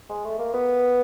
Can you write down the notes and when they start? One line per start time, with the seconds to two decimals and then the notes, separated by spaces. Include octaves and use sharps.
0.10 G#3
0.25 A3
0.39 A#3
0.53 B3